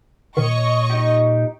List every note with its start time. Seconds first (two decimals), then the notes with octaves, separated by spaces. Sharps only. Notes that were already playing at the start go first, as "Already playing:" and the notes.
0.37 A#2 D#3 C#5 D#5 C#6
0.90 D#4 G4